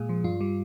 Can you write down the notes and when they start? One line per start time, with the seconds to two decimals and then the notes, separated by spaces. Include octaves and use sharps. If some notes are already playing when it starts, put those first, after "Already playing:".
Already playing: A#2 G#3 G#4
0.09 F3
0.24 G2 F4
0.41 G3